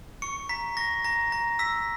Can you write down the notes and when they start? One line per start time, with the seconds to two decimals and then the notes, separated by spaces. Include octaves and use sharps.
0.22 C#6 C#7
0.49 A#5 B6
0.77 C#6 A#6
1.04 A#5 A#6
1.32 A#5 A#6
1.59 E6 B6